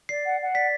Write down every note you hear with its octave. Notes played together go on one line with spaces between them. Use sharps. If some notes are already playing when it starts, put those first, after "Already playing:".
D5 C7
F#5
F#5
D5 B6